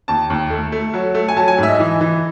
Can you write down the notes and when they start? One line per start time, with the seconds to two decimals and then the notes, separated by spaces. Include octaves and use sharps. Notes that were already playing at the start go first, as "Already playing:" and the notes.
0.08 D#2 A5
0.30 D#2
0.50 A3
0.72 A3
0.94 F#3
1.15 A3
1.28 G#5
1.37 F#3 A5
1.48 G#5
1.58 G#2 E5
1.68 D#5
1.80 E3
2.01 E3